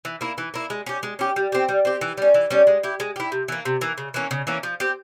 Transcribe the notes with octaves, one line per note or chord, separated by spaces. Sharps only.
E3
A#3 E4
E3
A#3 E4
G#3
C#4 G4
G#3
C#4 G4
G3
C4 G4
G3
C4 G4
E3
G3 C#4
E3
G3 C#4
G#3
E4 G4
G#3
E4 G4
C3
E3 A#3
C3
E3 A#3
C#3
E3 A#3 C#4
C#3
E3 A#3 C#4
F3
C4 G4